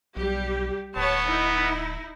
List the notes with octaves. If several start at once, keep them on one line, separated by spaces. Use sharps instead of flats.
B1 G3 G4
D1 B3 C#5 A5
D#4 E4